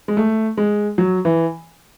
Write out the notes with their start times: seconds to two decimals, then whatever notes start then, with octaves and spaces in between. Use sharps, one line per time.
0.08 G#3
0.17 A3
0.57 G#3
0.98 F#3
1.25 E3